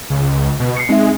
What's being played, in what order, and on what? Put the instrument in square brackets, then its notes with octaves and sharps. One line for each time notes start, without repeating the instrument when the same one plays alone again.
[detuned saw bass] C#2 [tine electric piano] C#3
[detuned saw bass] B2
[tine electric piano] C7 C#7
[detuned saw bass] G#3 [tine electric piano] C4 D#4 E5